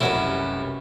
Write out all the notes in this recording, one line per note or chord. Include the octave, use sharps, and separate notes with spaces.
F1 C2 F#2 C#4 E4 F#4 B4